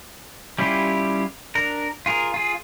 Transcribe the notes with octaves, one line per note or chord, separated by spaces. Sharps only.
G3 C#4 E4 F4 G4
D4 A#4
F4 G#4 A#4
F4 G#4